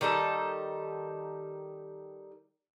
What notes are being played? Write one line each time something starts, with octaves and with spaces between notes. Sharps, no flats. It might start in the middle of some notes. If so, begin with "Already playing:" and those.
D#3 G3 D#4 A4